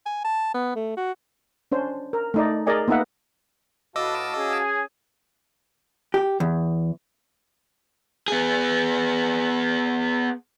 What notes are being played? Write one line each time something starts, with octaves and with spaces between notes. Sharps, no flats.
G#5
A5
B3
A3
F#4
C#4 D4 C5
A#4
A3 D#4 D5
G#4 A#4 D5 D#5 G#5
A#3 B3 D#4 B4 E5 F#5
A2 F#4 B4 D#5 F5 A5 D6 E6
C#4 G#4 G#5
G4
E2
B3 G#4